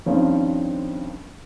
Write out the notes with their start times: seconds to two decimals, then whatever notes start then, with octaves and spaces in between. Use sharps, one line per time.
0.06 G2 D#3 F3 G3 C4 C#4